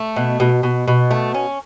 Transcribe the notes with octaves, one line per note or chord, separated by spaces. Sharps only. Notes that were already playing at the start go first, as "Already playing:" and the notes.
Already playing: A3
B2
B2
B2
B2
A3
C#4